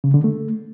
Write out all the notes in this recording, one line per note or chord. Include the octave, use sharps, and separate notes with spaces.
C#3
D3
A3